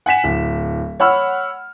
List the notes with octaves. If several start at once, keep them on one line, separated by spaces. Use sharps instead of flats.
F#5 G#5 B6 E7
D1
C#5 F#5 B5 E6 F6